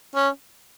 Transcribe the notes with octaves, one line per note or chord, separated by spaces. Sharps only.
C#4